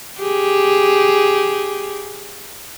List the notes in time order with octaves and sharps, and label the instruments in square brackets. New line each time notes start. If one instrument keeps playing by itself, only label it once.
[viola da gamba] G4 G#4